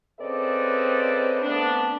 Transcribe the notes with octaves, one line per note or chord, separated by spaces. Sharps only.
C#3 C4 A4 B4 D5 D#5
A3 B3 C4 D4